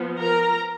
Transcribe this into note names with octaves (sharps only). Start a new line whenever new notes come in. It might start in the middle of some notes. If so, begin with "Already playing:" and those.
Already playing: F3 B3
A#4 A#5